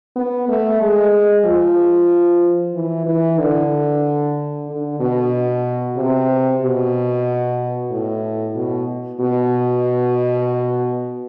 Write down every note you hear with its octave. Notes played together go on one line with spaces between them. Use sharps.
B3
A3
G#3
F3
E3
E3
D3
D3
B2
C3
B2
A2
B2
B2